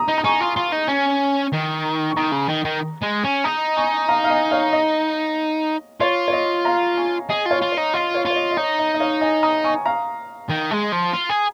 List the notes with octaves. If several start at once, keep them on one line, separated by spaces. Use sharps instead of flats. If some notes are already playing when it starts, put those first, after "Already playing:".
Already playing: A#5 D#6
D#4
A#5
D#4 G#5 C#6
F4
F4
D#4
C#4
D#3
C#6
D#3 A#5 D#6
C#3
D#3
D#3
G#3
C#4
D#4 A#5 D#6
G#5 C#6
F5 A#5
F5
D#5 G#5
C#5 F5
D#5
F4 C#5
C#5
D#5
F5 A#5
G#5 C#6
G#4 D#5 G#5
F4
C#5 F5
F4
D#4 C#5
F4 D#5
C#5 F5
F4 C#5
D#5
D#5
D#4 C#5
D#5
D#5
C#5 F5
D#5 G#5
A#5 D#6
G#5 C#6
F5 A#5
D#3
G#3
F3
F4
G#4